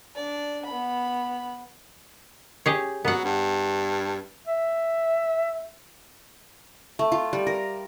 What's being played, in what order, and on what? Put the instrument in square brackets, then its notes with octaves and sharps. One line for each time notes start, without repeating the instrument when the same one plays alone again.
[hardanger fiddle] D4 D5
B3 B5
[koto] G4 G#4 C#5
[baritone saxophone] F#3 [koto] B3 F#5
[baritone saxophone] G2
[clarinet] E5
[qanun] A3
F4
G3
A#4